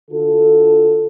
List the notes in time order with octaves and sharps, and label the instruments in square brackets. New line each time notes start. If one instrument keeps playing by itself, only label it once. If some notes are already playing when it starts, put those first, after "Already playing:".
[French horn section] D3 F4 F#4 A4